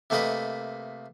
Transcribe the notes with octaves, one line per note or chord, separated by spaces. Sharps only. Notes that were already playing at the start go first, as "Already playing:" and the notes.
C3 A3 A#3 B4 D#5